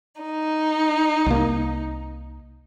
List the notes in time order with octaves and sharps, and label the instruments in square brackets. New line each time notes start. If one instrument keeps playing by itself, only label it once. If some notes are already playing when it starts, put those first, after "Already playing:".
[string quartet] D#4
[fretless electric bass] C2 A#3